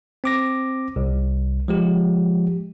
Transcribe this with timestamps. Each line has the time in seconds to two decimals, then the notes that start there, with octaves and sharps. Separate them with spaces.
0.24 C4 D6 A#6
0.96 C2
1.68 F3 G#3 G4